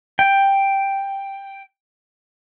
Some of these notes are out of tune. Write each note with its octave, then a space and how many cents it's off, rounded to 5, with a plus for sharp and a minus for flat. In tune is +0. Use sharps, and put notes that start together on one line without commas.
G5 +5